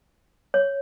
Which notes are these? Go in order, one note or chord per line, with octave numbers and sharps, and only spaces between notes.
C#5